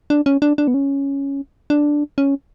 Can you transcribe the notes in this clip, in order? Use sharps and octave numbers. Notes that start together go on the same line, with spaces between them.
D4
C#4
D4
D4
B3
C#4
D4
C#4